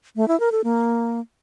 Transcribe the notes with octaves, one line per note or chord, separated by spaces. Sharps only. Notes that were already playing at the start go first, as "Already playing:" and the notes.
A3
E4
A#4
A4
A#3